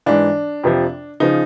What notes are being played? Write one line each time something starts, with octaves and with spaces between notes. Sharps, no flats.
G#2 E3 D4
F2 C3 F3
C#3 F3 D#4